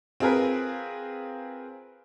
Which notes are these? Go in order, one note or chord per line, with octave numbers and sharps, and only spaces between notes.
C4 F4 G#4 A#4 B4